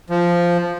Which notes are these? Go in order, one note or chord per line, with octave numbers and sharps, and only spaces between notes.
F3